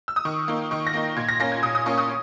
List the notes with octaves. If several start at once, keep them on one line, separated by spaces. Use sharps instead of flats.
E6
D#6
D#3 C#6
A#3 D#4
D#3 C#6
A#6
A#3 D#4
A#2 G#6
A#6
A#3 C#4 A#6
G#6
A#2 D#6
D#6
A#3 C#4 C#6
D#6